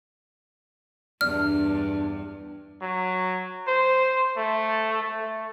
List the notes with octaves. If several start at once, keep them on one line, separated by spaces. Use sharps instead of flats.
E2 G2 D4 F6
F#3
C5
A3
A3